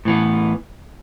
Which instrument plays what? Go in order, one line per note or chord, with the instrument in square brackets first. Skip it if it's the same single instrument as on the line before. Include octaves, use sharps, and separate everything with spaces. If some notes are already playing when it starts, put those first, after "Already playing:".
[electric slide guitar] A2 E3 B3